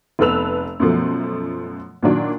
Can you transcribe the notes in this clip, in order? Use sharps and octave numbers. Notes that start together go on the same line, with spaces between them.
F1 B3 A4 B4 E6 F7
F#2 B2 F3 A3
A#2 D#3 F#3 D4